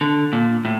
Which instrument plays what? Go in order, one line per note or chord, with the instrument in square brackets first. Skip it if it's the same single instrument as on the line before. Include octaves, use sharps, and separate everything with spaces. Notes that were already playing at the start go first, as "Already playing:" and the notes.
[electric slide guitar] D3
A#2
A2